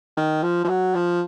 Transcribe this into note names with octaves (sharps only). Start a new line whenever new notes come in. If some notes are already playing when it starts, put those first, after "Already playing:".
D#3
F3
F3
F#3
F3